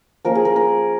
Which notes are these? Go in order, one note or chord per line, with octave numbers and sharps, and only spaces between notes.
F3 A#3 C#4 A#4
G#4
A#4
A#4